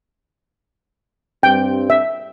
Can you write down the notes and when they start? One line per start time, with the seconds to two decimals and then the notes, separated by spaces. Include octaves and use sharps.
1.43 G2 C4 G5
1.90 E5